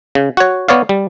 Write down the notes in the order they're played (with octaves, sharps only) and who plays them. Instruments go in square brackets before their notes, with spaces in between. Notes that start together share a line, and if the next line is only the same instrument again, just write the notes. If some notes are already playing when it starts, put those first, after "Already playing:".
[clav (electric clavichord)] C#3
F#4 C#5
B3 C#5 D5 F5
G3